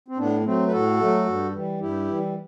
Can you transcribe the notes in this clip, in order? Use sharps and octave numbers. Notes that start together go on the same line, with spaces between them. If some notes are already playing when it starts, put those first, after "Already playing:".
C4
A2 B3 D4
F#3 A3 C4
B4
A2 F#4 A4
F#3 A3
G2
E3 G3
G2 E4 G4
E3 G3